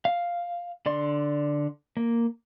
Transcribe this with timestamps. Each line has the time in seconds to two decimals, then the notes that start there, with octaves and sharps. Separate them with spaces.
0.05 F5
0.86 D3 D5 C6
1.97 A#3